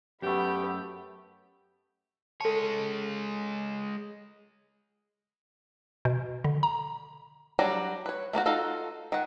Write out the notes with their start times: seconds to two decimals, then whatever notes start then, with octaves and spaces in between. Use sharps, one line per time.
0.22 F#2 A3 B3 G4 B5
2.41 G#3 A4 C#5 A5
6.05 B2
6.44 D3
6.63 A#5
7.59 F#3 G3 D4 A#5
8.06 B4 C#5
8.33 A3 A#3 D4 F#4
8.46 D#4 F4 F#4 A4 F5
9.12 D#3 F#5